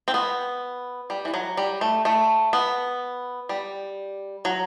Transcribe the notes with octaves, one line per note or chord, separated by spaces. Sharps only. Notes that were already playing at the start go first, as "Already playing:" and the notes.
C4
B3
G3
E3
F#3
G3
A3
A3
B3
G3
F#3